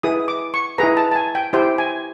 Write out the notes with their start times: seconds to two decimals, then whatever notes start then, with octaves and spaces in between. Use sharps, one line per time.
0.03 E4 G#4 B4 D#6
0.28 D6
0.54 C#6
0.78 E4 G#4 B4 A#5
0.97 A5
1.11 A5
1.15 G#5
1.35 G5
1.53 E4 G4 C5 G5
1.78 G#5